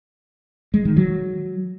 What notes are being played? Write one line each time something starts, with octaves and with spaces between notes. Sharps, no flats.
G#3
D#3
F#3